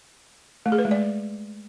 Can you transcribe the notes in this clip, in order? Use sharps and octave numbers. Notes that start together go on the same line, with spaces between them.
A3
G#4
B4
G#3
D5